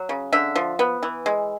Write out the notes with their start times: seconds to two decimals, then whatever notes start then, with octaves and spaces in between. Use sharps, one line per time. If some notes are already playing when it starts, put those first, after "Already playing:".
Already playing: F#3
0.09 C#3
0.33 D3 E5
0.56 F3
0.79 B3
1.03 E3
1.26 G#3